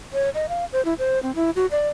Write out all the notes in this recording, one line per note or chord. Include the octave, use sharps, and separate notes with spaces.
C#5
D#5
F5
C5
E4
C5
C4
E4
F#4
D5